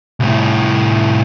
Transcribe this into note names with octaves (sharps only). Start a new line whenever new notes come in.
C2 A2